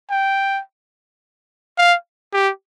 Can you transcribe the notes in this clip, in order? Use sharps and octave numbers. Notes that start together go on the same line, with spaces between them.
G5
F5
G4